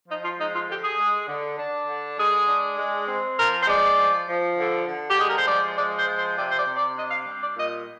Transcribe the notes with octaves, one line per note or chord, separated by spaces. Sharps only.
F3 D#4
F4
G#3 D#4
F4
D3 G4
G#4
G#3
D3
D4
D3
G#3 G#4
D4
G#3
C4
F3 A#4
C5
G#3 D5
F3
F3
D3
D3
G4
G#3 G#4
A#4
C5
F3 D5
G#3 D5
C5
F3
C5
C3 D5
C5
D5
C3
D5
D4 D#5
F5
G3
D5
A#2 D#5